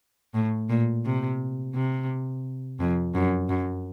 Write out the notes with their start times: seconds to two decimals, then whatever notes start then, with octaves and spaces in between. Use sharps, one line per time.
0.34 A2
0.70 A#2
1.05 C3
1.75 C3
2.80 F2
3.15 F#2
3.49 F#2